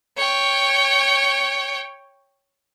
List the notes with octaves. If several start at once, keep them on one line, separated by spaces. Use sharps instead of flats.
C#5 G5